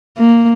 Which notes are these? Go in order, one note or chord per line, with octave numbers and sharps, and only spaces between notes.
A#3